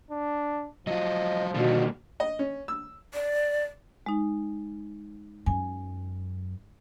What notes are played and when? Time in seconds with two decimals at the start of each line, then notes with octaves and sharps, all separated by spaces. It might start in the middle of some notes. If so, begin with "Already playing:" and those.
0.11 D4
0.87 F3 F#3 F4 D#5
1.54 B2 D3 D#3 G3 A#3
2.20 D#5
2.39 C#4
2.68 E6
3.14 D5
4.06 G#3 D#4
5.46 F#2 G#5